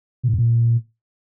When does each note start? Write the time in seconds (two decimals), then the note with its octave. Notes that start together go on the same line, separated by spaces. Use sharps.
0.23 B2
0.28 A2
0.33 F#2
0.38 A#2